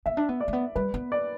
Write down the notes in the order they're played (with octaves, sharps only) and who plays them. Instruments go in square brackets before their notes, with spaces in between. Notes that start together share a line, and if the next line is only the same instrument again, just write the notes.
[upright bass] B3 [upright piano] E5
[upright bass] D4
B3
[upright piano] D5
[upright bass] A3
B3
[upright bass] G3 [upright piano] B4
[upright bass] B3
[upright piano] D5